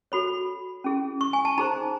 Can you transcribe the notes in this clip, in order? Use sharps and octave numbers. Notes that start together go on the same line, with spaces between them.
F#4 A4 C#5 B5
C#4 E4 G#4
C#6
G#5
A5
D#4 G#4 C5 A#5